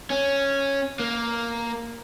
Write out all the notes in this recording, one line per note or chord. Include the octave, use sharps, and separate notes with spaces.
C#4
A#3